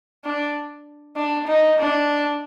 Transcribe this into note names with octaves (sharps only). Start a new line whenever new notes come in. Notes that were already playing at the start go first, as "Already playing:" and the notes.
D4
D4
D#4
D4